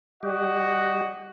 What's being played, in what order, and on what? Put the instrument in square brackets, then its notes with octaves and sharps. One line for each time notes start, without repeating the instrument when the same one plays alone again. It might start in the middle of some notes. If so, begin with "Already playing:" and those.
[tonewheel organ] G3 G4 [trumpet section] F#4 D#5 F#5